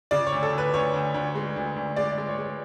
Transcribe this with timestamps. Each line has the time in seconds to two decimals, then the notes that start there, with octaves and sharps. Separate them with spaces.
0.11 C#3 D5
0.27 C#5
0.32 D2
0.43 A4
0.52 D2
0.58 B4
0.74 D2 C#5
0.93 D2
1.14 D2
1.35 G#3
1.56 D2
1.76 D2
1.96 G#3 D5
2.12 D5
2.18 G#3
2.28 C#5
2.38 G#3